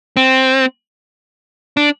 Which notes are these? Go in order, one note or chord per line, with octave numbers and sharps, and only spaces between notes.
C4
D4